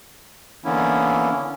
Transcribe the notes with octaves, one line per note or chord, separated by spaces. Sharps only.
D3 E3 A#3 B3 C#4 E4